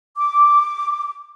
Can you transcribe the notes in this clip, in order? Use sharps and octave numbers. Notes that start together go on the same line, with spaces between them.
D6